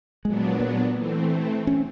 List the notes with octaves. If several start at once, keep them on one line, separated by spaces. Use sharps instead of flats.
A#2 F#3 G#3 B3 D4
A#3
E3 A3 C4
C#4